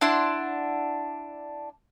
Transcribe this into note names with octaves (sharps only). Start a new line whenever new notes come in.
D4 E4 F#5 C6